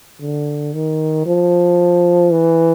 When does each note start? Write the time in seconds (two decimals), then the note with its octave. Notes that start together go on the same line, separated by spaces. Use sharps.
0.21 D3
0.74 D#3
1.26 F3
2.31 E3